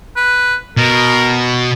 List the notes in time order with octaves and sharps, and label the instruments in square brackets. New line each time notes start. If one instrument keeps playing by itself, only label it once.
[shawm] B4
[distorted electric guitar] B2 [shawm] A#4